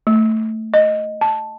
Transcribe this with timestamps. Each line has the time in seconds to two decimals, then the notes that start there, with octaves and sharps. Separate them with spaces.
0.07 A3
0.74 D#5
1.21 A5